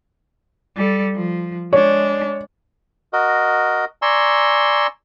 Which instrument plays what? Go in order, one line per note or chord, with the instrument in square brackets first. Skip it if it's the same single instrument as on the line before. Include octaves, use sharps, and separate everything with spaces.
[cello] G3 A4
F3
[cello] G#3 D4 [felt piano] C#5
[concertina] F#4 A#4 D#5
D5 G#5 A#5 C6 C#6 E6